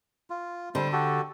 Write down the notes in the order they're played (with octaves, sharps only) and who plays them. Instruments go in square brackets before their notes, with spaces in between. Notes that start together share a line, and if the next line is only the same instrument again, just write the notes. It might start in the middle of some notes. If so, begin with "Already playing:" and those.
[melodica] F4
[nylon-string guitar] D3 [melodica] G3 C5
[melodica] F#4 G4 A4